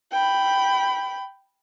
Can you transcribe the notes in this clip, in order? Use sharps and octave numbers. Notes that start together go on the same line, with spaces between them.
G5 B5